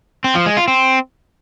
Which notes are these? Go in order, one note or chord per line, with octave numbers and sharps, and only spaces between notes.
C4
F3
G#3
F4
C4